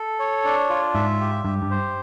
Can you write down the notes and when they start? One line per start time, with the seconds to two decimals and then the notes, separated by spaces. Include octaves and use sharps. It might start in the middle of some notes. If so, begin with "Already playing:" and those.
Already playing: A4
0.19 C#5
0.45 D4
0.69 F4
0.94 G#2 E5
1.20 G4
1.45 G2 G4
1.62 G2
1.71 C5